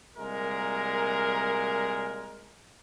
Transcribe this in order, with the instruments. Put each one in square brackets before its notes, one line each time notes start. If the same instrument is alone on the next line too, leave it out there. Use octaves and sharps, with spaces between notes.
[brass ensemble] C2 A#2 G#3 A#4